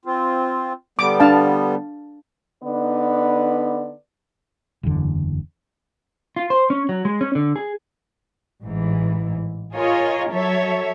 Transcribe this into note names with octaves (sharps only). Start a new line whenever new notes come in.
C4 F4
D3 G3 B3 D6
D4 F5 A5
D3 B3 D#4 B4 D5
F#1 E2 D3
F4
C5
C#4
F#3
G#3
C#4
D3
G#4
A1 G#2 E3
F4 G#4 A#4 C#5 D#5
F#3 A4 C#5 E5